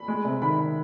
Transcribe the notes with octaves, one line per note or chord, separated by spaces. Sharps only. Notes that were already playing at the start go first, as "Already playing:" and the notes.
Already playing: B5
G#3
C3
D#3 B5